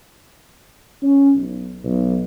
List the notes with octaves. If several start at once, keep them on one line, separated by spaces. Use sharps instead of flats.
C#4
B1
B1